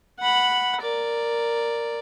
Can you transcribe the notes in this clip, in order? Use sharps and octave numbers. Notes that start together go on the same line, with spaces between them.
F#5 B5
A#4 D5